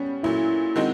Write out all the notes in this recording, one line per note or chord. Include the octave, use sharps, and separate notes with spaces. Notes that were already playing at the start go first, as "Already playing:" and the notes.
Already playing: G3 B3 C#4
A#2 F#3 A3 E4
D#3 G#3 C4 D#4 F#4